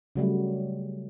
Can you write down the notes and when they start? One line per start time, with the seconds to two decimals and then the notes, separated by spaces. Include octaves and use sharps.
0.16 C#3 F#3 G3 A3